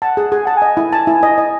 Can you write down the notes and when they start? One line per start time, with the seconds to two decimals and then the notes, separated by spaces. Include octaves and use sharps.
0.02 F#5 A5
0.17 G#4
0.32 G#4 G#5
0.45 F#5 A5
0.57 D#5 G#5
0.77 E4
0.93 A5
1.07 E4
1.23 D#5
1.38 D#5